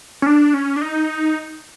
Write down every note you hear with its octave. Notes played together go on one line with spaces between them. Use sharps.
C#4
D4
C#4
D4
D#4